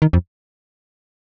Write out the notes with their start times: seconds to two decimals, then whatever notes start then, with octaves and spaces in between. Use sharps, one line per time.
0.02 D#3
0.13 F2